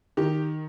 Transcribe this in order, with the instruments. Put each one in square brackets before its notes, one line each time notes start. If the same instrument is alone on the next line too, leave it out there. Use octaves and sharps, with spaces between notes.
[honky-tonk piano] D#3 G4